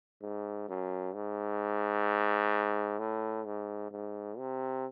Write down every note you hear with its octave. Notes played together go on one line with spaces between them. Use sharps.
G#2
F#2
G#2
A2
G#2
G#2
C3